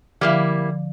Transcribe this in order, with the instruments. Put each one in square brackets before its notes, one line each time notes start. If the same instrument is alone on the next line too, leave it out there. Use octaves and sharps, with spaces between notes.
[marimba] D3 F3 [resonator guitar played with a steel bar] G3 A#3 E4